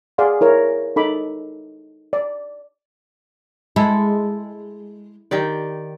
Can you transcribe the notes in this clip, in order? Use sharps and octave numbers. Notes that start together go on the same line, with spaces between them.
G#4 D5 F5 F#5 C6
E4 A#4 C#5
D#4 A4 B5 D6
D5
G#3 E4 A4
D#3 G4 D5